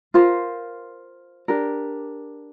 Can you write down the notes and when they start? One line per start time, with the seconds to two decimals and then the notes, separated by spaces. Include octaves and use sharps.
0.14 F4 A#4 C5
1.48 D4 G4 A#4